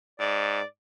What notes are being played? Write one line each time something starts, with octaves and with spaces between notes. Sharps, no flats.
G#2 D5